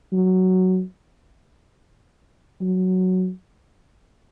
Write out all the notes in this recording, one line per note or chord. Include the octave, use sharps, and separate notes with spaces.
F#3
F#3